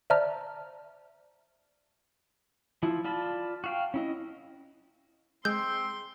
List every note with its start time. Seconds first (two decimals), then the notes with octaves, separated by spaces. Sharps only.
0.10 C5 D5 E5 A5 A#5 F6
2.83 F3 E4
3.04 F4 D5 A5 B5
3.64 F#4 F5 G5
3.94 C#4 E4 D#5
5.45 G#3 C4 C6 G6